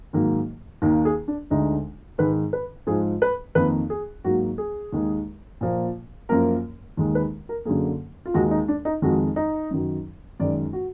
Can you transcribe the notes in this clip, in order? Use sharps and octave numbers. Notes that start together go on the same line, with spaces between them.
G#2 D#3 F#3 A#3
D#2 D#3 A#3
G#4
D4
D2 D3 G#3 D#4
G#2 D#3 G#3 B4
B4
G#2 F3 G#3 G#4
B4
F2 D#3 A#3 B4
G#4
G#2 F#3 A#3 F#4
G#4
D#2 D#3 G#3
A#2 F3 A#3
F#2 F3 A#3 A#4
D#2 D#3 G#3
B4
A#4
F#2 D3 F#3 A#3 G#4
F4
D#2 D#3 G#3 F#4
D#4
D4
D#4
F2 D#3 G#3 F#4
D#4
F#2 D#3 F#3
F#2 D#3 G#3 D5
F#4